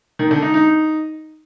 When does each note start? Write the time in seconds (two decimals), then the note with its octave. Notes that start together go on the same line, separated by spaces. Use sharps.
0.19 D#3
0.31 D3
0.42 D#4
0.54 D#4